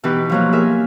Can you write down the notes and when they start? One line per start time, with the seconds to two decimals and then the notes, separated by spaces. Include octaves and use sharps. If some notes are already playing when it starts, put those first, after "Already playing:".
0.03 B2 E3 D#4 G4 B4
0.29 F3 F#3 A#3
0.52 G#4 A#4 E5